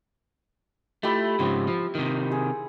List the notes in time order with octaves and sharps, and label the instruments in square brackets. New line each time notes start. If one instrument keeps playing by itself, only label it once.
[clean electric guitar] A3 [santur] E4 F4 G4
[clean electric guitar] G#2 C#3 F3 [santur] C4
[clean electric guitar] F3
C3 D#3
[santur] G#4